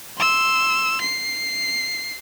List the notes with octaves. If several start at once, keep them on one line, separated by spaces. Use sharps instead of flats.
C6 E6
C7